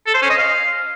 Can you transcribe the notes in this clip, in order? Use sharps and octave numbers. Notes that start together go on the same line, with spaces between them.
A4
C5
C#4
D#5
F5